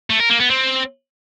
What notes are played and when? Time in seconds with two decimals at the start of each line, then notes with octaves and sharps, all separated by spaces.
0.10 A3
0.20 A#4
0.30 A#3
0.40 B3
0.50 C4